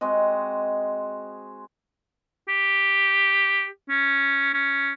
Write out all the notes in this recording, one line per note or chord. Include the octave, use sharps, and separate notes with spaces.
G#3 C4 F#4 D#5
G4
C#4
C#4